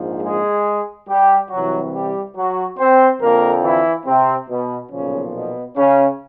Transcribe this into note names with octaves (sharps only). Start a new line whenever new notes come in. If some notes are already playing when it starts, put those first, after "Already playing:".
Already playing: A#1 G#2 F3
G#3 G#4
G3 G4
C2 C3 E3 F#3 F#4
G3 G4
F#3 F#4
C4 C5
F2 D3 F3 A#3 A#4
E3 E4
C3 C4
B2 B3
B1 A#2 C#3 F3 C#4
B2 B3
C#3 C#4